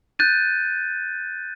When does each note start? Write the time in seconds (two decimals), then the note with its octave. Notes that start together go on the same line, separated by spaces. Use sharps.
0.19 F#6 G6 A6 D#7